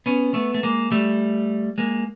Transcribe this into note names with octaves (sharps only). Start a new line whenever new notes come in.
B3 C#4
A3 B3
A3
G#3 A#3
G3 A3
G#3 A#3